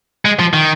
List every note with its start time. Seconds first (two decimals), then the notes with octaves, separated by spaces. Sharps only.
0.25 G#3
0.39 F3
0.54 D#3